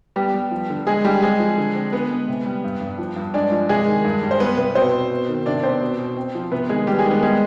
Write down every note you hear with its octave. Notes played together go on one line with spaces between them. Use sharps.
G3 B3 G4
G3
F3
D3
G#3 G#4
D3 G3 G4
G#3 C4 G#4
F3
D3
C4
D3 B3 B4
G#3
C3
G3
G2
G2
F3
G2
G#3 D4 D5
F3
C3 G#3 G#4
D#3
G2
G3
C5
G3 B3 B4
C3 B3 B4
B2 C4 C5
B2
B3
D#3
C3 D4 D5
B3 C4 C5
B2
B2
C4
F3
C3 B3 B4
D#3 G#3 G#4
D#3 G3 G4
G#3 G#4
D#3
B3 B4
G3 G#3 G#4